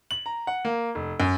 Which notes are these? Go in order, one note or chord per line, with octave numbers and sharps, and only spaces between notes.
F#7
A#5
F#5
A#3
F1
F#2